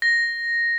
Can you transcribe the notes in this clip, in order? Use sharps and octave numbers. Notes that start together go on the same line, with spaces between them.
A#6